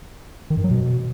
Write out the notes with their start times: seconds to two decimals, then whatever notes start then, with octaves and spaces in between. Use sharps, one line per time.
0.50 D#3
0.57 G2
0.64 F#3
0.71 B2